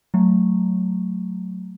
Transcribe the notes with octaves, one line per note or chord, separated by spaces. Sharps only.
F#3 A3